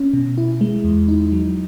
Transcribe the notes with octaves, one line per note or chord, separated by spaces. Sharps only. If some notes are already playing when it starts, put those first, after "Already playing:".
Already playing: C#4
B2
E4
G#3
E2
D#4
F#3